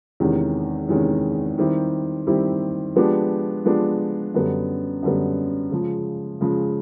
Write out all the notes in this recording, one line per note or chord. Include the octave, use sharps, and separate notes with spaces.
E2 C3 D#3 G#3 C#4
E2 C3 D#3 G#3 C#4
D#3 G3 C4 E4 G4
D#3 G3 C4 E4 G4
F3 G#3 B3 D4 G4
F3 G#3 B3 D4 G4
F#2 D3 G3 B3
F#2 D3 G3 B3
C#3 F3 G#3
C#3 F3 G#3